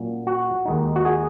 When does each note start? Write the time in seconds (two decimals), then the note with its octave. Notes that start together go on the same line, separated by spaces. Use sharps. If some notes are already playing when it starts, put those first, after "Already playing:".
Already playing: A#2 F#3 C#4
0.27 F#4
0.65 D#2 D#3 G#3 D#4
0.96 F#4
1.05 G#4